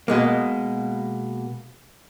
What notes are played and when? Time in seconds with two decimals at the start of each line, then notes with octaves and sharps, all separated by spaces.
0.08 B2 G#3 A#3